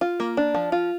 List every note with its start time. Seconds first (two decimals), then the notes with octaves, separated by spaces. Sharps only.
0.01 F4
0.20 A#3
0.37 D4
0.54 F3
0.72 F4